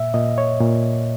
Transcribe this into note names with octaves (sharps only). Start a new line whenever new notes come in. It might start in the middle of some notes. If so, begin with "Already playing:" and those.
Already playing: A#2 E5
A#2 D#5
C#5
A#2